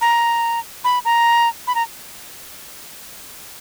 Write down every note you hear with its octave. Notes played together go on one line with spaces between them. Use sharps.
A#5
B5
A#5
B5
A#5